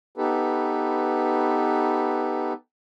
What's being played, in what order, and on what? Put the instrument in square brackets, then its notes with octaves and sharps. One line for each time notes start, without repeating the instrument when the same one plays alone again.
[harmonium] B3 D#4 G4 A4 B4